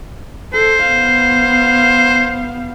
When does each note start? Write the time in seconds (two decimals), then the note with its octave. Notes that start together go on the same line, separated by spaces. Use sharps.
0.53 A4 C5
0.87 B3 F5